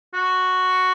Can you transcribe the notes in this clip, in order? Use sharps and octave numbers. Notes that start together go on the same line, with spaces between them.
F#4